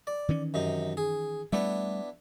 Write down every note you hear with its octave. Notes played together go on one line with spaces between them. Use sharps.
D5
D#3 E3 C#4
F#2 C3 D#4
G#4
G3 A3 B3 D4 E4